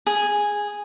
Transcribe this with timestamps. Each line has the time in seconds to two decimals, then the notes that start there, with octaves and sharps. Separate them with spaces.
0.07 G#4